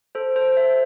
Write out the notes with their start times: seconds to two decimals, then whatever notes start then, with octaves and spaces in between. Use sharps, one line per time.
0.15 A4 C5
0.36 A4 C5
0.57 C5 E5